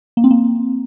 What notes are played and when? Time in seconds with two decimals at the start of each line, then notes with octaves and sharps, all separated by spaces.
0.17 A#3
0.24 C4
0.31 A#3